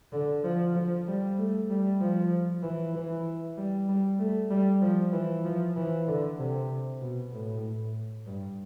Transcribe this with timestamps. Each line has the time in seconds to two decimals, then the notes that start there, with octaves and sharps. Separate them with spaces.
0.12 D3
0.44 F3
0.76 F3
1.07 G3
1.38 A3
1.70 G3
2.01 F3
2.63 E3
2.95 E3
3.57 G3
3.88 G3
4.19 A3
4.50 G3
4.82 F3
5.13 E3
5.45 F3
5.76 E3
6.07 D3
6.39 C3
7.01 B2
7.32 A2
8.26 G2